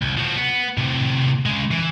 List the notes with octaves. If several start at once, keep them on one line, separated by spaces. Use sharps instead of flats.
C2
F3 F#4
B3
A2 C3
C#3 G#3
E3